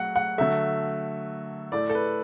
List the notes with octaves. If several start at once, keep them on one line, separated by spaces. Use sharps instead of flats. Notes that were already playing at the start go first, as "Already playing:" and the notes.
Already playing: F#3 A3 F#5
F#5
D3 F#3 A3 E5
A2 A3 D5
A4
B4